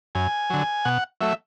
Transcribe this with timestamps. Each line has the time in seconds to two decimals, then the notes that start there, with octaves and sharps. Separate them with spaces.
0.15 F#2 G#5
0.50 D3 F#3
0.85 B2 F#5
1.21 F#3 A3 E5